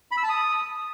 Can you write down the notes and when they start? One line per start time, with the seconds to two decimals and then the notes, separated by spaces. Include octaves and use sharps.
0.11 B5
0.17 E6
0.23 A5
0.29 D#6